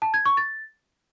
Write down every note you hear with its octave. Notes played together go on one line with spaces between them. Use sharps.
A5
G#6
C#6
A6